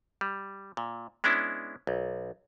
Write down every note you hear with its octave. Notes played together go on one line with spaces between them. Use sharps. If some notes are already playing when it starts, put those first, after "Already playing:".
G3
A#2
G#3 B3 C#4 D4 E4
B1